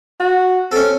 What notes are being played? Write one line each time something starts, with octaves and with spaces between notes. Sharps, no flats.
F#4
C4 C#4 A4